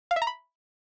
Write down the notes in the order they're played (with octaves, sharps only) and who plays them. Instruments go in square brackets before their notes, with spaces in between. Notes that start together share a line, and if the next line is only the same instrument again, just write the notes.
[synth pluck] F5
E5
A#5
B5